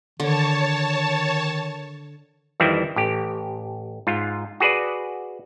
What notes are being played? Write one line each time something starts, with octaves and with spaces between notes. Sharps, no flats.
D3 D#3 C#5 A5
F2 D#3 E3 G3 C4 E4
A1 G4
G#2 F4
F#4 G#4 B4 D5